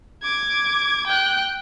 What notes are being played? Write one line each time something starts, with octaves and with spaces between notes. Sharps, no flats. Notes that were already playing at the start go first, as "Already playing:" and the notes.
D6 G#6
G5 F#6